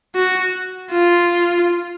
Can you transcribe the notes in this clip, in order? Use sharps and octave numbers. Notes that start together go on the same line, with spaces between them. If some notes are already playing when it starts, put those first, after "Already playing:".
F#4
F4